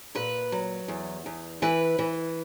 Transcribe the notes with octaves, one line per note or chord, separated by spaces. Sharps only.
A#2 B4
F#3
E2
E2
E3 B4
E3